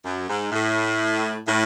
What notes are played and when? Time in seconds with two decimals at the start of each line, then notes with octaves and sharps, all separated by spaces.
0.05 F#2
0.29 G#2
0.52 A2
1.48 A2